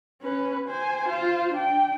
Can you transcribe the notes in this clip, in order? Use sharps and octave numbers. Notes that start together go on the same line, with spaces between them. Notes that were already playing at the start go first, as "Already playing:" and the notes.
C#4 B4
C5 G#5
F4 C5
D4 G5